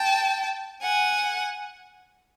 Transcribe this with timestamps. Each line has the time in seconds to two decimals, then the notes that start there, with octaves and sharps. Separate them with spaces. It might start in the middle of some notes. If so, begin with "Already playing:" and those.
Already playing: G5 A5
0.81 F#5 G#5